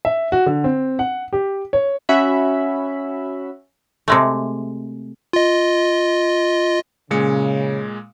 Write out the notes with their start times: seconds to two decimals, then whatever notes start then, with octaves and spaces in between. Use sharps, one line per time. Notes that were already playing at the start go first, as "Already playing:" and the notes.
0.05 E5
0.32 F#4
0.46 D3
0.64 C4
0.99 F#5
1.33 G4
1.73 C#5
2.09 C#4 F#4 E5 B5
4.08 C3 G#3 A3
5.33 F4 D#5
7.11 A#2 C#3 G#3 C#7